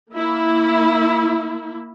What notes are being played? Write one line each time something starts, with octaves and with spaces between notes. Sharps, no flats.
A#3 E4